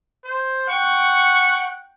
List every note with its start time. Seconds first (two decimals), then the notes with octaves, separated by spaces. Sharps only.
0.24 C5
0.69 F#5 G5 C#6